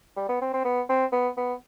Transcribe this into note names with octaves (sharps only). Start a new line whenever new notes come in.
G3
B3
C4
C4
B3
C4
B3
B3